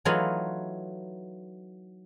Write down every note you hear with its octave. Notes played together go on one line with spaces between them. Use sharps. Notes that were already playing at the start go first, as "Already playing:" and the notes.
E3 F#3 A3 D#4 F4